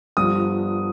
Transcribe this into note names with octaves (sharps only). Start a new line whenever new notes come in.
G1 G2 F3 D#6